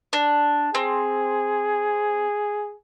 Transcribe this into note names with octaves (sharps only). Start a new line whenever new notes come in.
D4
C4 G#4